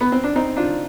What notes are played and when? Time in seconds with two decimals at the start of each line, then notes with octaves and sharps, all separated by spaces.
0.01 B3
0.12 C4
0.24 D4
0.35 C4 D#4
0.57 D4 F4